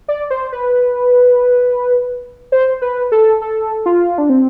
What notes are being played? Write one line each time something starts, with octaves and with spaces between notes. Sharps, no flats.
D5
C5
B4
C5
B4
A4
A4
F4
D4
C4